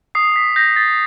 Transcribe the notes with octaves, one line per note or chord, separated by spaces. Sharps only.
D#6 C7
B6
G6 A#6
A6